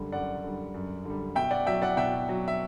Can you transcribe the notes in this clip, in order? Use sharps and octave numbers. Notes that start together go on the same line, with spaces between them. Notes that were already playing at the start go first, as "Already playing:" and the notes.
Already playing: F#2 D3 G3
F#2 D5 F#5
D3 G3
F#2
D3 G3
B2 E5 G5
D5 F#5
F#3 E5 G5
D5 F#5
B2 E5 G5
F#3
E5